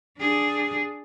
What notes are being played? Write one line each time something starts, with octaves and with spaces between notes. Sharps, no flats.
D4 G#4